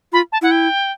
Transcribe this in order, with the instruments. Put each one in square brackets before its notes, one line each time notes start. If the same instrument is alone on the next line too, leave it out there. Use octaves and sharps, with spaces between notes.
[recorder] F4 [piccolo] B5
[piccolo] A5
[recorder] E4 [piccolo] F#5
[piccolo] G5